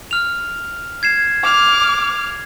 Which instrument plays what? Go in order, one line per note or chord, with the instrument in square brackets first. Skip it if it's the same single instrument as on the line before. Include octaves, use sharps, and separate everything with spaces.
[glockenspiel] F6 F7
G#6 C7 E7
[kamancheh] D6 F6